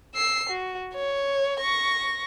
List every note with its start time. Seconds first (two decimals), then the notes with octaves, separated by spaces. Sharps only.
0.15 E6 C7
0.49 F#4
0.95 C#5
1.61 C#6 A#6